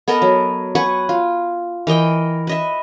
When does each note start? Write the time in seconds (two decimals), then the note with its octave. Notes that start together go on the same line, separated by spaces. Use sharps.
0.08 B3 A4 A#4 D#5
0.22 F#3
0.75 B4 F#5 G#5 C#6
1.09 F4
1.87 E3 A#4 D#5 G5
2.47 B4 D#5 E5